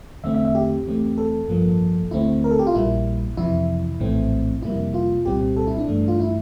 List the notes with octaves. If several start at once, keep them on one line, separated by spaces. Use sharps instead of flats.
E2 D3 A3 C4 E5
E5
E5
G4
E2 E3 A3 C4
A4
A1 G2 F3 A#3
D2 D3 A3 C4 E4
A#4
A4
G4
F4
A#1 A#2 G3 A#3 E4
F2 C3 E3 E4
A#1 A2 E3 A3 C4
F2 C3 G3 A#3 E4
F4
C2 A#2 G3 C4 G4
A4
E4
D4
G2 E3 A3
F4
E4